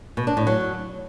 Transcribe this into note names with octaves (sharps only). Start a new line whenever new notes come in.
B2
D4
A2
F#3